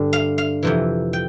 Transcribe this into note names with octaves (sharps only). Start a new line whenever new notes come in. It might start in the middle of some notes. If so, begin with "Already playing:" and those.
Already playing: G2 D3 D5
F5
F5
F2 C3 E3
G5